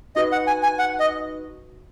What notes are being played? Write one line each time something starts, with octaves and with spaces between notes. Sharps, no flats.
D#4 F#4 B4 D#5
F#5
G#5
G#5
F#5
D#5